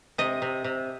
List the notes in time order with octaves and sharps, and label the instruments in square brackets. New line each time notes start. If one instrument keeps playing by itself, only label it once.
[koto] C3 D#5
C3
C3